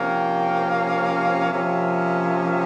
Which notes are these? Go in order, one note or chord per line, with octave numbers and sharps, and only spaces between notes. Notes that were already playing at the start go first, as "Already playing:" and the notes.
Already playing: C3 F3 A#3 C#4 G5
F5
C3 F3 A#3 C#4 E5